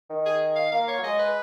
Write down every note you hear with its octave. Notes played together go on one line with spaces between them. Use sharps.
D#3
G#4
F5
A#3 F5
C#5
F#3
G#3 D#5
B4